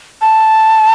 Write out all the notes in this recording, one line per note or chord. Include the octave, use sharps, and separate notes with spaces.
A5